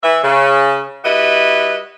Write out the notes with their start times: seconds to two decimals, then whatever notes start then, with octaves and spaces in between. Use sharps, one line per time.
0.02 E3 E5
0.23 C#3
1.04 G3 E4 F#4 B4 D#5